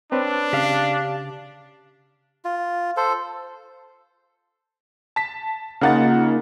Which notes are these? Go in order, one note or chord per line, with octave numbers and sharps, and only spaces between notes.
C4 D4 B4 C#5
C#3 G4 F5
F4
A4 C5
A5 B6
C#3 A#3 D#4 F4 F#5 A6